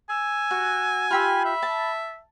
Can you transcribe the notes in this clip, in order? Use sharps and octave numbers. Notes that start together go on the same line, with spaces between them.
G#5 E6
F#4
F4 G4 B5 E6
E5
A5